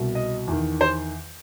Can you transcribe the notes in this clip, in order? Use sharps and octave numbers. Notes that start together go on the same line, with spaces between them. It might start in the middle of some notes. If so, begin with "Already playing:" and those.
Already playing: C2 B2
D#5
E2 D#3
C5